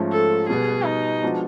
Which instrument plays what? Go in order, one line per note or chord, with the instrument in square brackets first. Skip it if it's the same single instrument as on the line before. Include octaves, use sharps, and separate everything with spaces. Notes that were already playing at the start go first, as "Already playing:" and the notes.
Already playing: [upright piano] G#2 F3 A3 C#4
[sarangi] A4
[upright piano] B2 G3 B3 [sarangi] G#4
[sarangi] D#4
[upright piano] F3 G#3 B3 D4 F#4